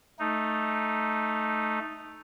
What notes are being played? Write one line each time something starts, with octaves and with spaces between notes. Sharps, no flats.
A3 D#4